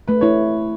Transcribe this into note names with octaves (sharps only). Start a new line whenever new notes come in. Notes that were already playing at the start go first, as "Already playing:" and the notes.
A3 B4
E4 C#5